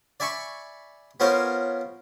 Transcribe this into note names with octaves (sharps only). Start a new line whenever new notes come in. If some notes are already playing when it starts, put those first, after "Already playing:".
D5 E5 G#5 B5 C#6
B3 C#4 F4 A#4 C5 C#5